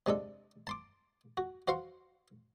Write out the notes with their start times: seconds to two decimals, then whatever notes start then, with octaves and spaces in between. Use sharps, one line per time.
0.06 C3 G#3 D4 A4
0.67 A5 C6 D6
1.37 F#4
1.68 F#4 C5 F5 C6 C#6